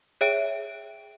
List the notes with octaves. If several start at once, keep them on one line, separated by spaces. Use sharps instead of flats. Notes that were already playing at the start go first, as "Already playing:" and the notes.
G#4 C#5 E5 G5 D7